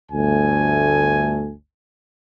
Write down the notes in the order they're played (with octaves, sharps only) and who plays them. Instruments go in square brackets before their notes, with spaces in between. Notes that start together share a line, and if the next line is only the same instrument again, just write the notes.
[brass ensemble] G1 D2 A3 G#5